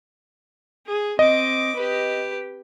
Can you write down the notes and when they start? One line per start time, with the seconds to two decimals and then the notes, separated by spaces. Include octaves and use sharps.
0.87 G#4
1.19 C4 D#5 D6
1.76 G4 B4